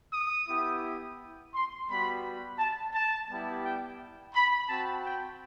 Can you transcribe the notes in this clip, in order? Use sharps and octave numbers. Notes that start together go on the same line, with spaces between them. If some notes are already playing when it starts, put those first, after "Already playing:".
D#6
B3 E4 G4
C6
G3 B3 F#4 B5
A5
A5
G3 B3 E4 G4
G5
B5
C4 F#4 A5
G5